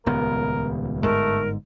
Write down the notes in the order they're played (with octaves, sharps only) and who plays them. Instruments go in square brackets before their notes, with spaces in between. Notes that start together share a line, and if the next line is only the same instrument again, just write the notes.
[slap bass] D#1 C#2 B3 [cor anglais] A#4
[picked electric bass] G1 G#2 [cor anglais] A3 [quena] A#4